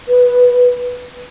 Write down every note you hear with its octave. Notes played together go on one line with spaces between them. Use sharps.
B4